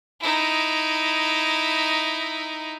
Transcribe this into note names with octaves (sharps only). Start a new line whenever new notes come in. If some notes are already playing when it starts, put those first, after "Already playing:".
D#4 E4